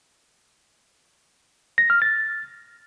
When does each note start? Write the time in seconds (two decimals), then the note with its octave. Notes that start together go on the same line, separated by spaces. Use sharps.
1.78 A#6
1.90 F6
2.02 A6